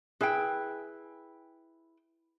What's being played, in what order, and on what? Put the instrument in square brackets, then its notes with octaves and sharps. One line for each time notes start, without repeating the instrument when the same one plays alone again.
[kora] E4 B4 [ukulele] G#4 G5